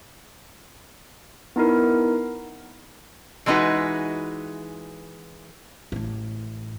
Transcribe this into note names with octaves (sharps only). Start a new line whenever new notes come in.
B3 D#4 E4 A#4
E3 G#3 D4 D#4 F#4 B4
A1 A2